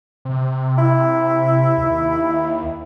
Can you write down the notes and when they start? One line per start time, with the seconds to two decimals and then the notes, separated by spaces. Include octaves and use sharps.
0.25 C3
0.78 E4
1.78 D#2